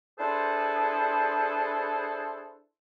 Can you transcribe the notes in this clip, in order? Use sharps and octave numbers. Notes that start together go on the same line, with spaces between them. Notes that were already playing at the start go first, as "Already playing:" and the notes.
D4 E4 G#4 A4 B4 C5